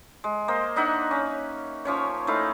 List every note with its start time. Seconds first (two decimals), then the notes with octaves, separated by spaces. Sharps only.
0.24 G#3
0.48 A#3 C5 D#5
0.76 D4 D#4 E5 F#5
1.11 C#4
1.85 F3 C#4 C#5
2.27 A3 D#4 E4 F5